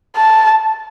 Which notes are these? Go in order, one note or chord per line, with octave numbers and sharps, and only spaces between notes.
A5